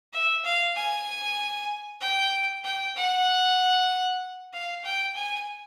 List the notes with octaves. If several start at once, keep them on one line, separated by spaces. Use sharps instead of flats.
E5
F5
G#5
G5
G5
F#5
F5
G5
G#5